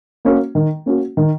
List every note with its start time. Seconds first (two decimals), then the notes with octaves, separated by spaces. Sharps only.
0.25 A#3 C#4 F#4
0.55 D#3
0.86 A#3 C#4 F#4
1.17 D#3